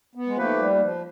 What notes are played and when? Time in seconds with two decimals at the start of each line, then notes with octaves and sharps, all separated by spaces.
0.15 B3
0.27 G#3
0.37 F3 A3 A#3 D#4 G4 B4
0.58 G3
0.80 F3